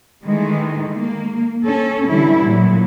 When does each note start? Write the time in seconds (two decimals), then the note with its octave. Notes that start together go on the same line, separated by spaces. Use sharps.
0.24 D#3 E3 G#3 A3
0.96 A#3
1.64 C#4 A4
2.08 D3 E3 F#3 G3 E4
2.44 A#2 F#3